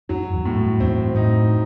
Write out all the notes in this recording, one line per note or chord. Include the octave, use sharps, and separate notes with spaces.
F#2 F#3
E2 G2
A2
F#2
E2 G2 C4
F#2 A2 D#4